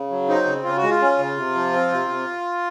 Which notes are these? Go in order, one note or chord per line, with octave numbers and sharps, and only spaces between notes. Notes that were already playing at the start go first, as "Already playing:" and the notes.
Already playing: C#3
F#3
C4 D#4
C#3
C#3 F4
F#4
G#3
F4
C#4
C#3
C3
F3
C4
C3
C3